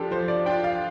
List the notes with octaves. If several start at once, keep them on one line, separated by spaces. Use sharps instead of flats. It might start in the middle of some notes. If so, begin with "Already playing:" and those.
Already playing: F3 D4 F4 G4 A4
F3 C5
D5
D4 F4 G5
F5